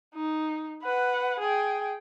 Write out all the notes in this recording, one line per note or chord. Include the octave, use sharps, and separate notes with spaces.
D#4
B4 F#5
G#4 G5